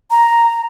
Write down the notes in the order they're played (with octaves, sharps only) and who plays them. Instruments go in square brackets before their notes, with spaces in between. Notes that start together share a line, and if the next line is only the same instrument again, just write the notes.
[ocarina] A#5